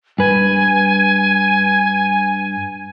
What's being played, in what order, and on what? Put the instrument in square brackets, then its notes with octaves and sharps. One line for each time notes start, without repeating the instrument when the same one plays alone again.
[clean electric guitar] G2 B4 [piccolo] G#5